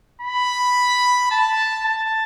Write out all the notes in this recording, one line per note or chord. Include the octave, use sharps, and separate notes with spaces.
B5
A5
A5